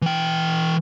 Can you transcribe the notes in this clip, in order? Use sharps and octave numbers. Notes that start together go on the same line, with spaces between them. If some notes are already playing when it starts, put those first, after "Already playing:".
E3 G5